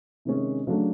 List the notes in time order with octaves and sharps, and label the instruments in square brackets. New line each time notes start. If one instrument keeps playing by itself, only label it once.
[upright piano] C3 D#3 G#3 C#4
C#3 F#3 A3 D4